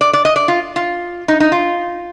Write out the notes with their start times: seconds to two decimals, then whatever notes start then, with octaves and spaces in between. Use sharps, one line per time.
0.01 D5
0.13 D5
0.25 D#5
0.36 D5
0.48 F4
0.76 F4
1.28 D#4
1.40 D#4
1.52 F4